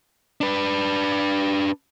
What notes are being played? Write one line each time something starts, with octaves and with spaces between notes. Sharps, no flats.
D4 B4